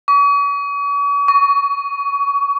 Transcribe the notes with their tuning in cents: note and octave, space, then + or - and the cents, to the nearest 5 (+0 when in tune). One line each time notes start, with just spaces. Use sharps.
C#6 +45
C#6 +25